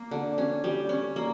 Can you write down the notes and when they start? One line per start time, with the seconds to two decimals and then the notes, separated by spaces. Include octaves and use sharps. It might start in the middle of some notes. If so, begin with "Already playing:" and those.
Already playing: A#3
0.11 D3
0.38 C#4
0.64 G3
0.89 C#4
1.16 A#3